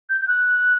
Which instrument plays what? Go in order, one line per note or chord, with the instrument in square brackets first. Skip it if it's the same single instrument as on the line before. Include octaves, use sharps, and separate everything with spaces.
[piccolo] G6
G6
F#6